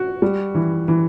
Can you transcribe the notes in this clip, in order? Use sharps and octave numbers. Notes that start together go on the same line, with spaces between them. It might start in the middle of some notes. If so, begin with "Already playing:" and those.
Already playing: F#4
G3
E3
E3